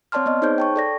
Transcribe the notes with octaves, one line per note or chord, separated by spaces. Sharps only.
C4 C#5 D5 A5 C6 F6
B3 D#5
D#4 G#4 C5 C#5 G6
G5 A5 C#6
A4 D5 A#6